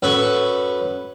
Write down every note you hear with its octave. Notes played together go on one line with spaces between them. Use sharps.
F#2 A4 B4 C#6